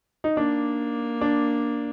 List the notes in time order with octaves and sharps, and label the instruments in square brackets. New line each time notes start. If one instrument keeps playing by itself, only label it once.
[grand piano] D#4
[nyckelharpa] A#3 [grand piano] D4
[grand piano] D4